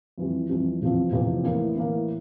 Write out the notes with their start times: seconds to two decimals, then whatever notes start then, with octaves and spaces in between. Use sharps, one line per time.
0.18 F2 E3 G3
0.49 F2 E3 G3
0.81 F1 E2 C3 F3
1.12 F1 E2 C3 F3
1.43 A2 E3 A#3
1.76 A2 E3 A#3